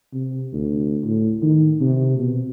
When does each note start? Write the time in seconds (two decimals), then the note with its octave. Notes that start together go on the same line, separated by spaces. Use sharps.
0.13 C3
0.53 D2
1.05 A2
1.43 D#3
1.81 C3
2.18 B2